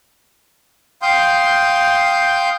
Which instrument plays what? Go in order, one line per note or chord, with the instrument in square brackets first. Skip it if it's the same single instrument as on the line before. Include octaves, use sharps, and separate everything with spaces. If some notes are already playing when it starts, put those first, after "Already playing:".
[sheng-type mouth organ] F5 G5 C6 D#6 G6